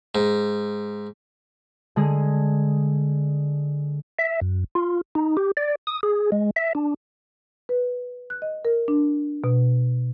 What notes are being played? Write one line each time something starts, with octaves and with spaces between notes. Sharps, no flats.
G#2
D3 G#3 G#4
E5
F#2
F4
D#4
G4
D5
D#6
G#4
G#3
E5
D4
B4
F#6
D#5
A#4
D4
B2